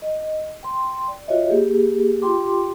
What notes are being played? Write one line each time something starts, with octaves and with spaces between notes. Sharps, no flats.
D#5
G5 C6
D5
F4 F#4 C#5 D#5 E5
A#3 G4 G#4
F4 G4 G5 C6 D6